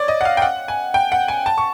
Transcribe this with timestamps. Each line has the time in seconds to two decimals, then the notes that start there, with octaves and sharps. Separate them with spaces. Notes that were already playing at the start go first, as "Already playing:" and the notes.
Already playing: C#5 D5
0.08 D#5
0.21 F#5
0.25 F5
0.37 G5
0.42 F#5
0.68 G#5
0.94 G5
1.12 F#5
1.28 G#5
1.46 A5
1.58 C#6